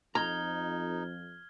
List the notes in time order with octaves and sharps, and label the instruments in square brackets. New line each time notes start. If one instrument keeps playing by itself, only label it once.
[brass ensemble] F2 [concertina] D#4 [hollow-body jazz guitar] A#5 [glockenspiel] F6 G#6 G7